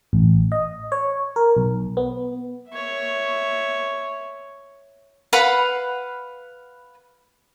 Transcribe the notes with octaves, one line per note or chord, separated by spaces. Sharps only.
A1
D#5
C#5
A#4
B1
B3
C#5 E5
B4 F5 F#5 B5